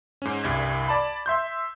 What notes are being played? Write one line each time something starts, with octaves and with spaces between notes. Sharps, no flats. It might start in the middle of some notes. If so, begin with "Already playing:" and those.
G#2 C#4
C2 G2 G#6
D5 A5 B5
E5 C6 G6